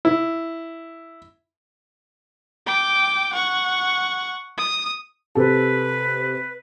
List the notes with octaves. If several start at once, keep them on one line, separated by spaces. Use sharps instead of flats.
E4
G5 D6
F#5 C#6
D#6
C3 A4 B4